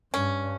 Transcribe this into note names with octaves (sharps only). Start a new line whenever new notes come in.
G2 C#4